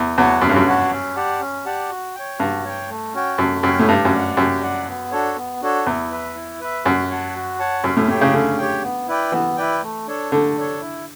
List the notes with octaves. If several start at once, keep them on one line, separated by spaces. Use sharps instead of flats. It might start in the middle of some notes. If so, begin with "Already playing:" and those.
Already playing: E2
E2 F#4 C#5 F#5 A5
F#2 C#4
G2
F#2
F#4 C#5 F#5 A5
C#4
G4 D5 F#5 A5
C#4
G4 D5 F#5 A5
F#4
C#5 G5
G2 F#4
C#5 G5
A3
C#4 F#4 C#5 G5
F#2 A3
F#2 C#4 F#4 C#5 G5
A2
G2 G4
F#2
D5 F#5
F#2 G4
D5 F#5
B3
D4 F#4 A4 C#5
B3
D4 F#4 A4 C#5
E2 E4
B4 E5
E4
B4 E5
F#2 F#4
C#5 F#5 A5
F#4
C#5 F#5 A5
F#2 C#4
A2
A2 G4 C#5 G5
C#3
D3 C#4
G4 C#5 G5
B3
E4 B4 D5 G5
E3 B3
E4 B4 D5 G5
A3
D4 A4 C#5
D3 A3
D4 A4 C#5
E4